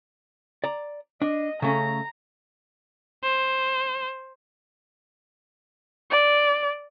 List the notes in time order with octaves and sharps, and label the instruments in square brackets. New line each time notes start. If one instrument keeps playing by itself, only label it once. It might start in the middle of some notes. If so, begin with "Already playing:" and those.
[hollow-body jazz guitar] D5 A#5
[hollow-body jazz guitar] D4 [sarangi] D#5
[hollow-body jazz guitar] C#3 A3 C#4 [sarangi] A#5
[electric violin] C5
[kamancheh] D5